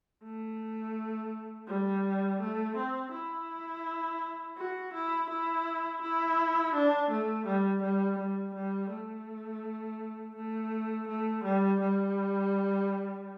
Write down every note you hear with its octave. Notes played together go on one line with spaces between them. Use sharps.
A3
G3
A3
C4
E4
F#4
E4
E4
E4
D4
A3
G3
G3
G3
G3
A3
A3
A3
G3
G3